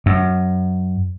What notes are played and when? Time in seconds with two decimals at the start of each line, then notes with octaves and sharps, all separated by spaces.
0.06 F#2